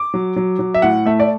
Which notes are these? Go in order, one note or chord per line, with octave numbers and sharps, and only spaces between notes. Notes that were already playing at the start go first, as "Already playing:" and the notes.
Already playing: D6
F#3
F#3
F#3
E5
A2 F#5
A3 E5
D5